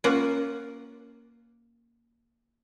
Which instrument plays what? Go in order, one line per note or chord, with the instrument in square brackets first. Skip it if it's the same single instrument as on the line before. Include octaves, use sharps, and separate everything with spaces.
[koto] A#3 C#4 F4 A#4 F#5